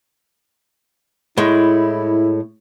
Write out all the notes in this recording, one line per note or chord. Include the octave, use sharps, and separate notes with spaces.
A2 G#3 E4